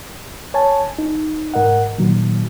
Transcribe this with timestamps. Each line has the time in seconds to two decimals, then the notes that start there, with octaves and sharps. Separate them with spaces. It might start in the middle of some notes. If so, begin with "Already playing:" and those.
0.54 C#5 G#5 A5
0.99 D#4
1.54 G#2 A#4 D#5 F#5
1.98 A#2 D#3 F#3